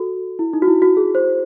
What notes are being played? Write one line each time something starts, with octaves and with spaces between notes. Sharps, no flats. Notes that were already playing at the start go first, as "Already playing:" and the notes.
Already playing: F#4 A4
E4
D#4
F#4
E4
F#4
G#4
C5